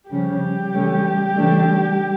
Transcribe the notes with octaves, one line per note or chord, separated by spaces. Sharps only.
C#3 F3 G3 C#4 G4
C#3 E3 A3 C#4
C#3 E3 A3 D4